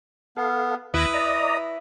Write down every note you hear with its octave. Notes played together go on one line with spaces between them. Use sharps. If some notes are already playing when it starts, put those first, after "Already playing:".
B3 A4 F5
D#2 E4 B4 D#6 F#6 A#6
D5 D#5 A#5